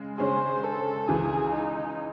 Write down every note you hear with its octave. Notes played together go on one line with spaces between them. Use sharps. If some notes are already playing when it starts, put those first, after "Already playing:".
Already playing: C#3 G#3 G#4
C#3 G#3 C#4 G#4 C5
A4
C#2 C#3 E3 G#4
D#4